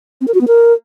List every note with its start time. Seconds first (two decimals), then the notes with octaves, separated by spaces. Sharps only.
0.21 C4
0.28 A#4
0.34 F#4
0.41 B3
0.47 A#4